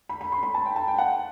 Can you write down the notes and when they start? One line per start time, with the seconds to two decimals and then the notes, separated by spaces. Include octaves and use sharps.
0.09 B5
0.21 B5
0.32 C6
0.43 B5
0.55 A5
0.66 G5
0.76 A5
0.88 G5
0.98 F#5